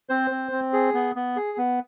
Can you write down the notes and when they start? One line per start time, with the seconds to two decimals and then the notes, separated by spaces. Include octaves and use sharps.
0.09 C4 C5
0.31 C4
0.52 C4
0.73 G#4
0.94 B3
1.16 B3
1.36 G#4
1.58 B3